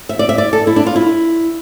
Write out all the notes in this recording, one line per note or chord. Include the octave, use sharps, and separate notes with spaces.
E5
D5
E5
D5
A4
E4
D4
F4
E4